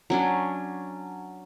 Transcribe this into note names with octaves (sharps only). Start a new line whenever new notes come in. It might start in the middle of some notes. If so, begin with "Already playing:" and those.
F#3 C#4 D4